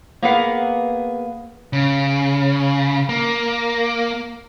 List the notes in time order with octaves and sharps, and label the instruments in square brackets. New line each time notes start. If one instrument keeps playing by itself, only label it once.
[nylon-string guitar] A#3 B3 G#4 B4 F5 F#5
[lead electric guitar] C#3
A#3